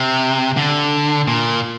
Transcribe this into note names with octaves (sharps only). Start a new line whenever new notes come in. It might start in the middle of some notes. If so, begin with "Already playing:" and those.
Already playing: C3
D3
A#2